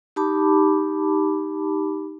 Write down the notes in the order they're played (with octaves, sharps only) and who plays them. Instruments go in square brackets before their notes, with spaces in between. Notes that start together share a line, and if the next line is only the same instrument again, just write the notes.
[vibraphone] D#4 G4 A5 B5 D6